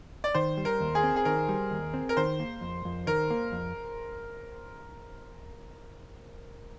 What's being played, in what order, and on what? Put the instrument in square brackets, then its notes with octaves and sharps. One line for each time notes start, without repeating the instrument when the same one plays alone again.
[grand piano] D5
[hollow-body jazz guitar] D#3 [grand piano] C5
[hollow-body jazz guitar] G3
[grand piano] A#4
[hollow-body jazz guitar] D#2
[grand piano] G#4
[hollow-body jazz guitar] C4
[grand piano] G#4
[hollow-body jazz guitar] D#3 [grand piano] A#4
[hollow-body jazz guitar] G3
D#2
C4
[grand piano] A#4
[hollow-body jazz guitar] D#3 [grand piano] C5
[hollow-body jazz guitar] A#3
F2
F2
[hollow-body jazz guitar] D#3 [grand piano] A#4
[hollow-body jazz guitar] A#3
F2